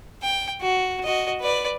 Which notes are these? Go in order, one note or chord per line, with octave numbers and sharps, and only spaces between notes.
G5
F#4
F#4 D#5
B4 D5